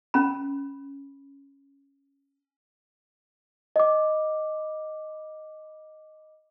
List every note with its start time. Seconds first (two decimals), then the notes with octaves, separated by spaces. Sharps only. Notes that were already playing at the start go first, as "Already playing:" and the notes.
0.14 C#4 B5
3.76 D#5 D6